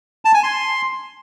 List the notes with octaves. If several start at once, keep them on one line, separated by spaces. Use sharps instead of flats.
A5
G#5
C6